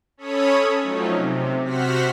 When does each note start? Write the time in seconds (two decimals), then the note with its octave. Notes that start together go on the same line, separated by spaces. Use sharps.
0.17 C#4 A4 C#5 B5 D#6
0.80 F3 F#3 A3 C#4 D#4
1.12 C3
1.64 C3 F#4 C5 F#5 F6 B6